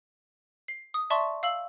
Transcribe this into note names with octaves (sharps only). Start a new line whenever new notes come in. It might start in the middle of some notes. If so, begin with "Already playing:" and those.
C7
D#6
D5 E5 A5 C6 C#6
F5 E6 F#7